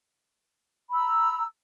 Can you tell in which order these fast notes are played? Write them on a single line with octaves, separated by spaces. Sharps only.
B5 E6 A#5